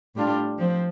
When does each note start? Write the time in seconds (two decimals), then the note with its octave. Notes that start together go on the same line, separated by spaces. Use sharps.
0.15 A2 G3 D4 F4
0.58 F3 C4